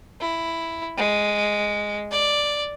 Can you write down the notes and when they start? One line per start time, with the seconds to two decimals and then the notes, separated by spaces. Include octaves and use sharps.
0.21 E4
0.97 G#3
2.11 D5